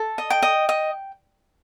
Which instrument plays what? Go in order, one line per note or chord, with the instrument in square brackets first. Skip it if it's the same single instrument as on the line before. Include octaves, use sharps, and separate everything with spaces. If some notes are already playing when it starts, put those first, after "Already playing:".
Already playing: [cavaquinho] A4
D#5
G5
D#5
D#5